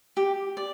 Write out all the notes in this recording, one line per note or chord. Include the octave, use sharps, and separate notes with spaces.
G4
D5